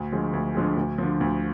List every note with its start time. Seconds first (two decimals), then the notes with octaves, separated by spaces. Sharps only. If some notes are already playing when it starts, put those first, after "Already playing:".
Already playing: D2
0.12 D3 F3 G#3
0.33 D2
0.55 D3 F3 G#3
0.77 D2
0.98 D3 F3
1.21 D2